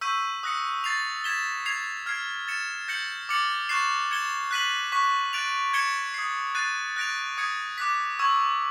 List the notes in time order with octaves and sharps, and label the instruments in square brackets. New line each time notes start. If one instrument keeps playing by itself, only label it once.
[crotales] C#6 E6 G6 B6 D#7
D#6 F#6 A#6 C#7
A6 C7 F7
G#6 B6 E7 G7
G#6 C7 F7
F6 G#6 C7
A6 C#7 E7
G6 A#6 C#7 F#7
D6 F6 A6 C#7 F#7
C#6 F#6 A6 C7 E7
G#6 C#7 E7 G7
F#6 B6 D#7 F#7
C#6 F#6 B6
F#6 A6 D7 F7
G#6 C#7 E7 G7
D#6 G#6 C7
F#6 A6 C7 D#7
F#6 A#6 D7 F7
D#6 G#6 C#7
D6 F#6 B6
C#6 E6 G#6